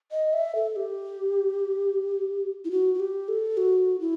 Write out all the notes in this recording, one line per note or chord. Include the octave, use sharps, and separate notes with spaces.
D#5
E5
A4
G4
E4
F#4
F#4
G4
A4
F#4
E4